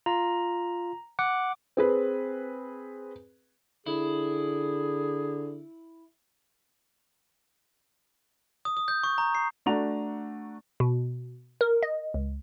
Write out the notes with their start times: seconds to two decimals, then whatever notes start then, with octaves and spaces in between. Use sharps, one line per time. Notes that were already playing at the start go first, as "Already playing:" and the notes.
0.06 F4 A#5
1.19 F#5 D6
1.77 C4 G#4 B4
3.86 D3 E4 G#4
8.65 D#6
8.77 D#6
8.88 G6
9.03 C#6
9.18 A#5
9.35 C7
9.66 A3 D4 F#4 A#5 F7
10.80 B2
11.61 A#4
11.83 D#5
12.14 C#2